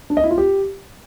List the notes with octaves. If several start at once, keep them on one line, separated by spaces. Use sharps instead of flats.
D4
D#5
E4
F4
G4